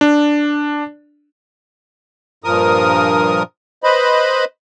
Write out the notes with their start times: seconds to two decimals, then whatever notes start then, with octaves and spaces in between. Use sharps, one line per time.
0.01 D4
2.44 G2 A#2 F3 A#4 D#6
3.84 B4 C5 D#5 B5